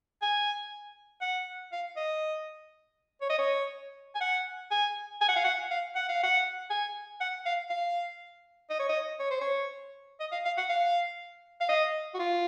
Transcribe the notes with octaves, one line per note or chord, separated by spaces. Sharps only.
G#5
F#5
F5
D#5
C#5
D#5
C#5
G#5
F#5
G#5
G#5
F#5
F5
F#5
F5
F#5
F5
F#5
G#5
F#5
F5
F5
D#5
C#5
D#5
C#5
C5
C#5
D#5
F5
F5
F#5
F5
F5
D#5
F#4
F4